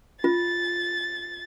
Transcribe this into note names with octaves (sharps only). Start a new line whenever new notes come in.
F4 A6